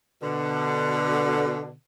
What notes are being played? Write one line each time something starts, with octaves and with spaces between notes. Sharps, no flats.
B2 D3